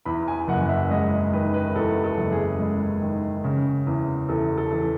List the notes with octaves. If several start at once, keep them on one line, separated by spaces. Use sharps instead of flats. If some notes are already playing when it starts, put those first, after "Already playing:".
E2 B5
G#5
F#1 F#5
E5
G#3 D#5
D#3 B4
B4
E2 A4
A4
F#1
G#4
G#3
D#3
C#3
E2
E2 A4
A4
E3